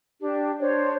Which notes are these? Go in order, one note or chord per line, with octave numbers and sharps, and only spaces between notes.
D4 G4
D4 C5 C#5